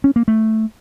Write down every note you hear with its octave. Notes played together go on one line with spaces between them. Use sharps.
C#4
A#3
A3